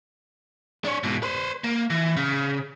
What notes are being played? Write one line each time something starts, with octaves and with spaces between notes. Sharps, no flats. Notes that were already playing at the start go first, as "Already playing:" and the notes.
D4 C#5
G#2 B2
B4 C5
A#3
E3
C#3